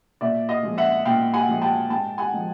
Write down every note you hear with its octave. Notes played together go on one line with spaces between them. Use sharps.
A#2 D5 E5
D#5 F5
F3 G#3
E5 F#5
A#2 F5 G5
F#5 G#5
F3 G#3
G5 A5
G#2 G5 A5
F#5 G#5
F3 G#3